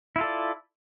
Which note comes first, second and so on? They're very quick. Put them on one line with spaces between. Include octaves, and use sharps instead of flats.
E4 F4 A4 D5